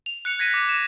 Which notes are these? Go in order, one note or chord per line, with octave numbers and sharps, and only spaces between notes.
F7
F#6 C#7 F7
G#6 A#6 B6 D#7
D6
E7